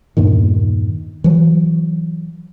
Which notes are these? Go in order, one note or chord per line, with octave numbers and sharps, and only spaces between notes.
E2 G2 A#2 D#3
E3 F#3